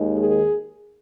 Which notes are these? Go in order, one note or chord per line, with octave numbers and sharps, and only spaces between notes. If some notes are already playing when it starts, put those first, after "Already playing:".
Already playing: D#2 D#3 G#3
G#4